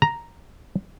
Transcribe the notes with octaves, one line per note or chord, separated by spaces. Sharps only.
A#5